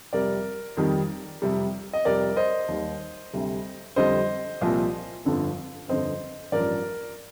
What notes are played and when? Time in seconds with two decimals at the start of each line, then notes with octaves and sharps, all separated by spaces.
0.13 F2 C3 G3 A#4 D5
0.77 F2 D#3 G3
1.42 F2 C3 G3
1.93 D#5
2.05 F2 C3 G3 A#4 D5
2.37 C5 D#5
2.68 D#2 D#3 G3
3.33 D2 C3 G3
3.96 F2 D3 G3 C5 D#5
4.61 C2 A#2 F3
5.25 G1 F2 D3 F3
5.88 G1 F2 D3 C5 D#5
6.52 A1 G2 F3 A#4 D5